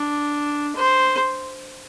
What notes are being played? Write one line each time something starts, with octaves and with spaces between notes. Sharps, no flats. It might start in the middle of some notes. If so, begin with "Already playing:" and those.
Already playing: D4
C5